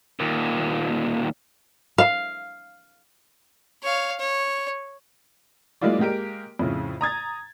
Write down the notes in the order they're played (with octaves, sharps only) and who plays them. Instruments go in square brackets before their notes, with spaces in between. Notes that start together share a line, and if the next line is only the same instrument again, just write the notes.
[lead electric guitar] D#2 A#2
[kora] F5
[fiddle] C#5 F5
C#5
[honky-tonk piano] F#3 G#3 A#3 E4 F4 D5
G#3 A#3 G4 A#4 D7
F2 A2 C#3
A#5 D#6 G#6 A6